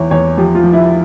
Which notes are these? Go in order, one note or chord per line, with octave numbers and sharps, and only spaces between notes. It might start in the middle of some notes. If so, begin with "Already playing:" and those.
Already playing: E2 E3 C#5
E2 C#5
F3 G4
F4
F3
E4